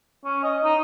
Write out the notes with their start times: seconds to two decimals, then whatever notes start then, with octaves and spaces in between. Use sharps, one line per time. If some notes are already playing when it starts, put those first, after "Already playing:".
0.24 C#4
0.44 D#5
0.64 D#4